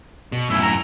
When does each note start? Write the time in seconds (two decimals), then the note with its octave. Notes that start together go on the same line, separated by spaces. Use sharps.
0.32 B2
0.50 F#2 A2 E4
0.62 A#5